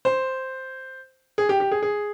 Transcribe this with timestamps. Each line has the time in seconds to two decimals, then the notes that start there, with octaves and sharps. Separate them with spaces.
0.05 C5
1.38 G#4
1.49 G4
1.60 G4
1.71 G#4
1.82 G#4